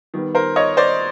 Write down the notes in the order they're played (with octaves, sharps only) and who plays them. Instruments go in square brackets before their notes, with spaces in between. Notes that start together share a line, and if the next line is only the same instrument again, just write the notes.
[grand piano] D#3 G3 B3
A#4 C5
C#5 D#5
C5 D5